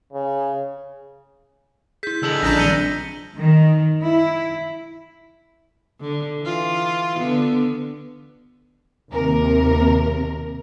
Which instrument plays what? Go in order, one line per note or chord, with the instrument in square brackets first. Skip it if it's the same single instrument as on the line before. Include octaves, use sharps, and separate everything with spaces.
[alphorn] C#3
[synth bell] E4 G#4 [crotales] G6 B6
[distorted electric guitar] D3 G#3 [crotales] E6 B6 F#7
[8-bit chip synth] A#1 D4 A#5 [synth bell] C#4 D#6 B6 [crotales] G6 A#6
[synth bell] D#3 G3 C4 [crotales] C#7 D#7 G7
[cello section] D#3
E4
[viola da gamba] D3
E3 F4
D3 B3
[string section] D#2 C3 A#4